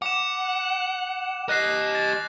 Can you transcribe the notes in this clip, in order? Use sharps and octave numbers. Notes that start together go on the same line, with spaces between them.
F#5 D6 E7
G4 D#5 F#6 A#6 C7
A6